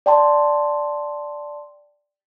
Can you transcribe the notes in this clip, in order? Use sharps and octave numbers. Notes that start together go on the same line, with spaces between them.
D5 G5 A5 C6